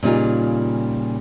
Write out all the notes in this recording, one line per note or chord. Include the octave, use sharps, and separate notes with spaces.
A#2 C#3 G3 D#4 F4 G#4